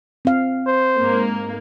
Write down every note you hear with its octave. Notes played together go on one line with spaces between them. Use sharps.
C4 F5
C5
G#2 A#3